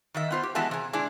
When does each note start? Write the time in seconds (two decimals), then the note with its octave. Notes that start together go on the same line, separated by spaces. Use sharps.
0.14 D#3 D#5 E5
0.31 B3 F4 C5
0.43 G4
0.55 E3 G#3 B3 F#4 E5 A5
0.71 C3 G#4
0.93 G#3 D4 E4 G#4